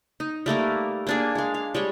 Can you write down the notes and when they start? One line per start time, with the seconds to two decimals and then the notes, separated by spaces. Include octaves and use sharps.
0.20 D#4
0.46 G3 A3 A#3 A#4
1.07 A#3 D4 G#4
1.35 G#3 F5
1.54 F5
1.75 G3 G#3 C#5